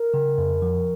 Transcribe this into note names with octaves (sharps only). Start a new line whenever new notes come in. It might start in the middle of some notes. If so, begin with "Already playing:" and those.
Already playing: A#4
C#3
F2
F3